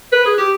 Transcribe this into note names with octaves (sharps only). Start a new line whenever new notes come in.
B4
G#4
G4